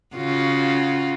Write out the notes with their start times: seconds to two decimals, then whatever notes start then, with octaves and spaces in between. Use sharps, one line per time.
0.16 C#3 F4 F#4